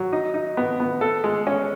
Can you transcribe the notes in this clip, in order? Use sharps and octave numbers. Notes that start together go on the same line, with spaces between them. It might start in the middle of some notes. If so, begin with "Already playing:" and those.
Already playing: F#3
D#4
D#4
B3
B3
A4
G#3
C#4